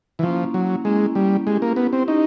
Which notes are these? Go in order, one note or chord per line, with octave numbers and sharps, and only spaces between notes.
E3
F3 A#3 C#4 E4
F#3
G#3 A#3 C#4 E4
G3
G#3 C#4 E4 G4
A#3
B3
C4
C#4 D#4 E4 G4